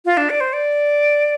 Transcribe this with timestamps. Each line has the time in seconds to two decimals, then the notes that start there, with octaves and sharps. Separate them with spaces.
0.06 F4
0.17 D4
0.30 D5
0.40 C5
0.53 D5